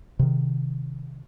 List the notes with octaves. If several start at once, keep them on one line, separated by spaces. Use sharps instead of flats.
C3 D#3